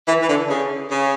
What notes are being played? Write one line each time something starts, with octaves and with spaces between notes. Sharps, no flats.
E3
E3
D3
C#3
C#3